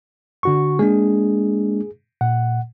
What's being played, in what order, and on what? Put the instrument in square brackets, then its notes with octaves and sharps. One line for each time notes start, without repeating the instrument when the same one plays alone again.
[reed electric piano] D3 F#4 C#6
[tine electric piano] G#3 A#3 D4 [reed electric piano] G#4
[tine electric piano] A#2 [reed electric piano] F#5